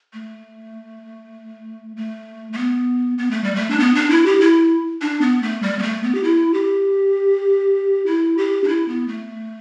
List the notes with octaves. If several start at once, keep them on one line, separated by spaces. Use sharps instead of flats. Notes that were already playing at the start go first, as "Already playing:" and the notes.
A3
A3
A3
B3
B3
A3
G3
A3
D4
B3
D4
E4
G4
E4
D4
B3
A3
G3
B3
A3
B3
G4
E4
G4
E4
G4
D4
E4
B3
A3